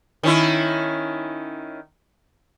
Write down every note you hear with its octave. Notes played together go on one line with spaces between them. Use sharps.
D#3 C#4 E4